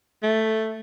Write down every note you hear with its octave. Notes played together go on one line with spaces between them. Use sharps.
A3